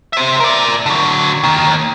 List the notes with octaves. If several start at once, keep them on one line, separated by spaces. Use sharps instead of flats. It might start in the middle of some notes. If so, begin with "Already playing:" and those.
C5 E5
A#4 D5
D3 F#3
D#3 A#3